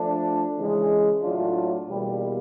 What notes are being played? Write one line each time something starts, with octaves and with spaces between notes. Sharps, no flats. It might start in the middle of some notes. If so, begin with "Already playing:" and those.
Already playing: F3 A3 D4
C#3 E3 G#3
A2 F#3 A3 D4 F4
E2 B2 G3 A#3